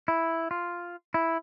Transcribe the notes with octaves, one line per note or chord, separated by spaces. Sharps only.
E4
F4
E4